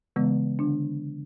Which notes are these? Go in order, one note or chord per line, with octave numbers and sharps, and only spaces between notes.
C#3 E3 G#3 B3
D3 D4